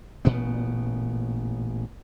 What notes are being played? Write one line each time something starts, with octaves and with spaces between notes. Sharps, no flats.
A1 A#2 C#3 B3